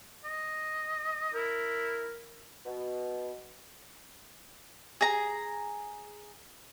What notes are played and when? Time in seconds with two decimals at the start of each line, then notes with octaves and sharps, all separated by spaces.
0.25 D#5
1.34 E4 A#4
2.65 B2
5.01 G#4 A#5